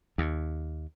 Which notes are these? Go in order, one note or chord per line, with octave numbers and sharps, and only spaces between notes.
D#2